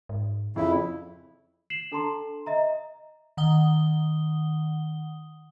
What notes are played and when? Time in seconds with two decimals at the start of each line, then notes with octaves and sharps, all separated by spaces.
0.09 G#2
0.56 F2 C#3 F3 E4
1.70 C7 E7 F#7
1.92 D4 A4 A5 A#5 C6
2.46 D#5 E5 A#5
3.37 D#3 F#5 D#6 G7